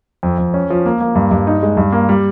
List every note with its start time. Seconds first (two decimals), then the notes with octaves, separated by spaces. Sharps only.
0.23 F2
0.38 F2
0.54 C#4
0.70 F3
0.86 A#3
1.01 A#3
1.15 G2
1.31 G2
1.47 D#4
1.63 G#3
1.77 G2
1.92 A#3
2.09 G3